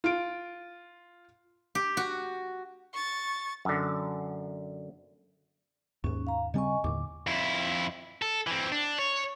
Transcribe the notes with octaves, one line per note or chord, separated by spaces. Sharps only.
F4 D7
G4
F#4
C#6 A6
F#2 D3
D#2 G#2 C#4
F5 A#5
C#3 G3 C4 D#5 G#5 C#6
D#2 A2 D3 D6
F2 E4
A4
E3 C4
D4
C#5